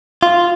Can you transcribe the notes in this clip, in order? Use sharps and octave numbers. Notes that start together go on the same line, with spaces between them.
F4